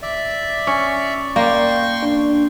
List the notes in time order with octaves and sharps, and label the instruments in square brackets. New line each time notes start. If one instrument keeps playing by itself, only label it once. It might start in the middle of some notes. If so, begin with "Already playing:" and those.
[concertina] D5 E5
[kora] C#4 [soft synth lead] C#6
[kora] A#3 [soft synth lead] D5 [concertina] G5 C6 C#6
[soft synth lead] D4